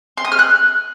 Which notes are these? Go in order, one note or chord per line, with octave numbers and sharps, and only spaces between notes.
C6
D#6
F6
F#6